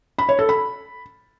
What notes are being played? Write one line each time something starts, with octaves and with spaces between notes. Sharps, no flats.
B5
C#5
A4
B5